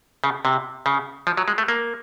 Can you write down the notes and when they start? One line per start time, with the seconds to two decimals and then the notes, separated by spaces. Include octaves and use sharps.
0.24 C#3
0.45 C3
0.86 C#3
1.27 F3
1.37 F#3
1.48 G#3
1.58 A3
1.68 A#3